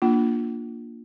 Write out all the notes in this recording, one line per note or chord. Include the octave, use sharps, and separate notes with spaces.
A#3 D4 F4